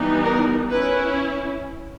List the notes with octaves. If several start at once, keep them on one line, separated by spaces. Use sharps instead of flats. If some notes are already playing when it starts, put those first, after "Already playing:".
Already playing: E3 G3 B3 D#4
A#4
C#4 E4 B4